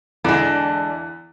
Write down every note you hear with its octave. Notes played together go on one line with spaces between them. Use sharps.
E2 D3 E3 G#3 D4